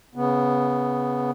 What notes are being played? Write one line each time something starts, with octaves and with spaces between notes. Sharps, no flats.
C#3 B3